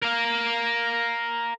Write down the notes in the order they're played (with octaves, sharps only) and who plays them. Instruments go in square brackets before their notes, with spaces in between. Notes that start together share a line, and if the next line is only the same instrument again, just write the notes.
[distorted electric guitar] A#4 F5